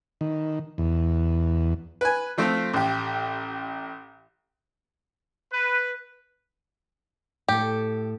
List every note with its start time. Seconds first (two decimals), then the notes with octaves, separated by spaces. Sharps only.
0.21 D#3
0.78 E2
2.01 B4 G#5
2.38 F3 A3 C4 F4
2.73 A1 G4
5.53 B4
7.48 A2 G4 A4